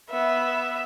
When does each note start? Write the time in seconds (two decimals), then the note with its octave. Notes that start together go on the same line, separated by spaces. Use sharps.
0.10 B3 E5